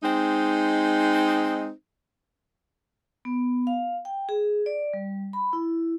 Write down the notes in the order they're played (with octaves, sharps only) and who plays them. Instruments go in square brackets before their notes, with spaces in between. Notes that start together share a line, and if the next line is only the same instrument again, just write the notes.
[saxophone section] G#3 C4 D#4
[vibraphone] B3
F5
G5
G#4
D5
G3
B5
E4